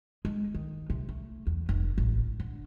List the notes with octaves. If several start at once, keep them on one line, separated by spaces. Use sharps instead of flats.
G#3
D#3
C3
A3
E2
F1
A1
D2
D3